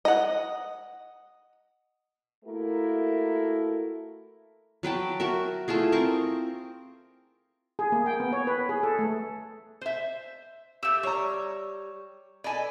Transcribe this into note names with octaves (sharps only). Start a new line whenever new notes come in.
D#5 F#5
A3 A#3 E4 F#4 A#4
F#3 B4 G5 A5
F#4 A#4 E5
A3 E4 F4 G#4
C4 A#4 C#6
G#4
A#3
G5
B3
C#5
B4
G#4
A4
A3
C5 E5
A3 G4 E6
G3 C#5 A#5
A4 B4 D5 D#5 G#5